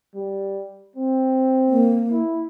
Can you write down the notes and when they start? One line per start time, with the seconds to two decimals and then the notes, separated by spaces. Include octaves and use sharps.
0.15 G3
0.96 C4
1.68 A#3
2.11 E4